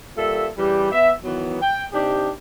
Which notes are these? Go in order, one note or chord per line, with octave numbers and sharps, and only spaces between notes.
G3 A#3 F4 A4 E5
C#3 E3 G3
B3 E5
D#3 E3 F#3 B3
G5
C3 D4 D#4 G4